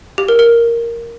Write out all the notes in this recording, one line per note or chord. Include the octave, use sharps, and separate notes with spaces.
G4
A#4
A#4